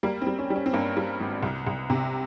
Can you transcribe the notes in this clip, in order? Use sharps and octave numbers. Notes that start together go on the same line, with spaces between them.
G3 A#3
C4
G3
C#4
G3
C#4
C4
G2 A#3
G3
G#1
C2
C2
C3